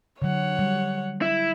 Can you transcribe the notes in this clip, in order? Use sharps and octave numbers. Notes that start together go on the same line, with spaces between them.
D3 F#3 C#5 F#5
G3
E4